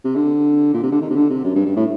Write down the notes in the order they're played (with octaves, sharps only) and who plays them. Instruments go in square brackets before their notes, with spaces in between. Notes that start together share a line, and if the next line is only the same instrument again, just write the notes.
[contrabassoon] C3
D3
A#2
C3
D3
D#3
C3
D3
C3
F#2
G2
G2
A2